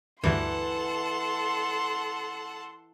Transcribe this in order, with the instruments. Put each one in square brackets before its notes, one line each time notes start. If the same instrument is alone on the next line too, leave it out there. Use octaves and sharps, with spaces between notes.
[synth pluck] D2 G2 [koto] E3 [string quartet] A4 F#5 A5 [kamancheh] C6